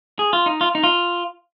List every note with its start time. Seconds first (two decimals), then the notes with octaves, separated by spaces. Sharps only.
0.19 G#4
0.33 F4
0.46 D#4
0.61 F4
0.75 D#4
0.83 F4